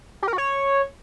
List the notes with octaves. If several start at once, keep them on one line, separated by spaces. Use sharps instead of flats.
G4
A#4
F#4
C#5